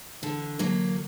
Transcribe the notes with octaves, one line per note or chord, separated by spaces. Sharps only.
D3 E3
D3 F#3 A#3